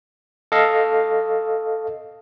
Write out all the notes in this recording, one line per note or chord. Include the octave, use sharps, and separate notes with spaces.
A4 D#5 F5